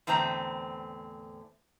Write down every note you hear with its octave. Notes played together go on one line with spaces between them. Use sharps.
E2 A2 D3 C4 A#5